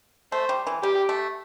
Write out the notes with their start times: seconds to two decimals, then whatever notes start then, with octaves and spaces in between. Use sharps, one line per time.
0.32 A3 C5
0.49 G3
0.67 E3
0.82 G3 G4
1.09 A3